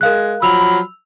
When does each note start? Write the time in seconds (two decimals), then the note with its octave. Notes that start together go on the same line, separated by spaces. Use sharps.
0.01 G#3 A#4 F5 F#6
0.42 F3 F#3 B5 E6 F7